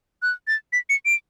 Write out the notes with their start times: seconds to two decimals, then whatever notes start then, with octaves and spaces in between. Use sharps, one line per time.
0.22 F#6
0.48 A6
0.73 B6
0.90 C#7
1.06 D7